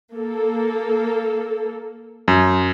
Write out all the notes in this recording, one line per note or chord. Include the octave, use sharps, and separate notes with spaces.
A#3 A4
F#2